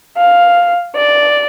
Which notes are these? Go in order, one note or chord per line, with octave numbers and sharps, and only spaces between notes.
F5
D5